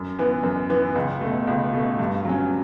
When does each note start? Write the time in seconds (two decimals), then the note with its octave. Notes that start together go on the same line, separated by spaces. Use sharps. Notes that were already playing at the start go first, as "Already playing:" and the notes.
Already playing: F#2
0.19 E3 B3
0.43 F#2
0.70 E3 B3
0.95 C#2
1.21 B2 A3
1.47 C#2
1.73 B2 A3
1.99 G2
2.25 F#3 C#4